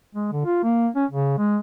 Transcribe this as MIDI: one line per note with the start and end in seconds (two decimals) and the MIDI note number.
0.15 0.29 56
0.32 0.45 50
0.45 0.63 65
0.63 0.88 58
0.96 1.05 61
1.11 1.36 49
1.38 1.57 56